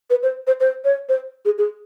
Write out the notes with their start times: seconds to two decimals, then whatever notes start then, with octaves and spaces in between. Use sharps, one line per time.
0.10 B4
0.23 C5
0.47 C5
0.60 C5
0.85 C#5
1.09 C5
1.45 G#4
1.58 G#4